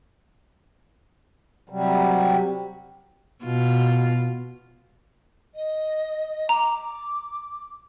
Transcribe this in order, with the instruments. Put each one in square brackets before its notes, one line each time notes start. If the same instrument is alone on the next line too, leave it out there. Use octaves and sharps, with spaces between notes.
[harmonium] C3 F#3 G3
[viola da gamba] B2 F4
[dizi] D#5
[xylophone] A#5 [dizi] D6